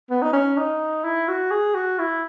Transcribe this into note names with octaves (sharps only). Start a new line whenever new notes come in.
B3
D#4
C#4
D#4
E4
F#4
G#4
F#4
E4